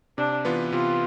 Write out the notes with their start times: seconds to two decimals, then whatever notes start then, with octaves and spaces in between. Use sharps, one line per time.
0.18 C3 D4
0.45 E3 B3 F4 B4
0.72 C3 F4